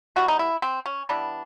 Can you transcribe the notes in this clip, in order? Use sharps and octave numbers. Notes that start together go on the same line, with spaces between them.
E3 G3 B3 F#4
D#4
E4
C4
C#4
E3 G3 B3 D4